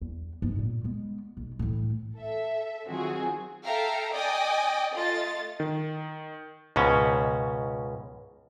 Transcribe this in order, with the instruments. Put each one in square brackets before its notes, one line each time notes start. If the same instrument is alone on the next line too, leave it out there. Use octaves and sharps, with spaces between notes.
[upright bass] E2
G#2 B3
A#2
G#3 B3
B1
A2 E3
[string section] A4 E5
D#3 F#3 C4 F4 F#4 G#4
[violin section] A4 E5 F5 G5 A#5
D5 D#5 G5 G#5 D#6
A3 F4 D#5 A6
[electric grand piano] D#3
[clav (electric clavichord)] C#2 G#2 B2 C#4